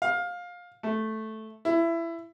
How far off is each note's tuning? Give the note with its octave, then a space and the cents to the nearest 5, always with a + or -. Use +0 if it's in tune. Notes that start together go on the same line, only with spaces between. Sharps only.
F5 +20
A3 -5
E4 +20